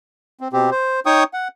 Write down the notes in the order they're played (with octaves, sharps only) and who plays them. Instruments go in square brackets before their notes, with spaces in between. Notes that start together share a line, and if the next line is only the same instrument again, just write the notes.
[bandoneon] C4
B2 C4 G4
C5
D#4 C#5 G5 C#6 D#6
F#5